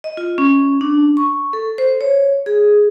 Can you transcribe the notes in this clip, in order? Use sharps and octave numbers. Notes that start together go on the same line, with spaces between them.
D#5
F4
C#4
D4
C#6
A4
C5
C#5
G#4